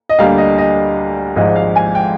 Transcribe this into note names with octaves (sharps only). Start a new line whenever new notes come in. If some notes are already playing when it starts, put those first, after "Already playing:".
D#5
D2 D3 G3 A#3 F5
D#5
D#5
G#1 G#2 F3 G#3 D#5
F5
G#5
G5